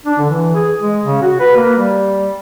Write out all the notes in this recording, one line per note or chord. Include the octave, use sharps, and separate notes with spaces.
D4
D3
E3
G#4
G#3
C#3
F#4
B4
A#3
G3